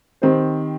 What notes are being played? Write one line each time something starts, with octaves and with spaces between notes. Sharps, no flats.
D#3 C4 G4 C5